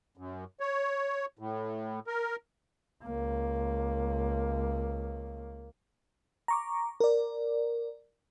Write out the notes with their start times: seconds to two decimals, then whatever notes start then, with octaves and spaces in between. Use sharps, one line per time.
0.17 F#2
0.60 C#5
1.39 A2
2.07 A#4
3.04 C#2 A#3
6.48 A#5 C#6 D6
7.00 A#4 D5